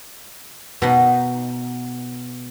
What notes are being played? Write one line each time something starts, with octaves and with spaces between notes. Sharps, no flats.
B2 D#4